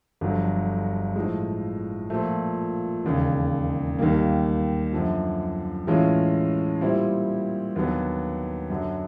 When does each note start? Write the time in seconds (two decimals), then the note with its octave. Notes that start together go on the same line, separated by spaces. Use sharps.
0.21 G1 F2 D3 F#3
1.16 A2 F3 G#3
2.10 A#2 F3 A3
3.05 E1 D#2 C#3
3.99 D#2 D#3 G3 A#3
4.93 F#2 D3 F3
5.87 A2 E3 G#3 C#4 F4
6.81 A#2 G3 C4 E4
7.76 D#2 D3 F#3 B3
8.69 F#2 D3 F#3